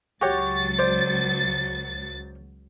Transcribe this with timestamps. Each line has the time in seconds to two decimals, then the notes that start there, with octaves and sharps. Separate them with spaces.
0.22 C#2 F#3 F#4 G4 C#5 A6
0.79 C5 D5